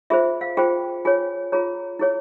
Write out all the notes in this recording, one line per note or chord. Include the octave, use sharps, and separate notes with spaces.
F4 G#4 C5 E5
F5
F4 G#4 C5 G5
F4 G#4 C#5 G#5
F4 G#4 C#5 A#5
E4 G#4 C#5